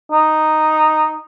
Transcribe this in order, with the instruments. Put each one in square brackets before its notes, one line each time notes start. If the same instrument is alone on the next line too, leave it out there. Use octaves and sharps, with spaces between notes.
[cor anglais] D#4